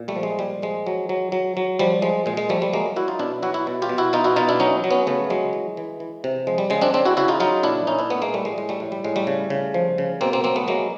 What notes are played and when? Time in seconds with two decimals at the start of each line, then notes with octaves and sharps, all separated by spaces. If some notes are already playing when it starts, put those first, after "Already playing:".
Already playing: A#2
0.08 G3 A3
0.16 F3
0.23 G#3
0.39 A#2 G3
0.62 F3 G#3
0.87 F#3
1.09 F#3
1.32 F#3
1.57 F#3
1.79 F3 G3
2.02 F3 G#3
2.26 A#2 G#3
2.37 G#3
2.49 F3 G3 A3
2.62 G3 A3
2.73 F#3 G#3 A#3
2.96 F#3 E4 F#4
3.08 D#4 F4
3.19 B2 D4 E4
3.43 F#3 E4 F#4
3.54 E4 F#4
3.67 B2
3.82 F4 G4
3.89 B2
3.98 E4 F#4
4.13 B2 D#4 F4
4.24 E4 F#4
4.36 B2 D#4 F4
4.49 D4 E4
4.60 F#3 C#4 D#4
4.84 F#3
4.91 B3 C#4
5.07 C#3 A3 B3
5.30 F#3 G#3
5.53 E3
5.77 E3
6.00 E3
6.24 C3
6.47 F3 G#3
6.58 G3
6.70 C#3 G#3
6.81 C4 D4
6.94 C#3 C4 D4
7.05 E4 F#4
7.17 C#3 E4 F#4
7.28 D#4 F4
7.40 F#3 D#4 F4
7.63 A#2 D4 E4
7.87 A#2 C#4 D#4
7.99 D4 E4
8.10 A#2 A3 B3
8.22 G#3 A#3
8.34 A2 G3 A3
8.45 G#3
8.58 A2 G#3
8.69 G3 A3
8.80 A2
8.92 G3
9.04 A2 G#3
9.16 G3 A3
9.27 C#3
9.50 C#3
9.74 F3
9.98 C#3
10.21 B2 A#3 C4
10.33 A#3 C4
10.44 F#3 A#3 C4
10.56 A3 B3
10.68 F#3 G#3 A#3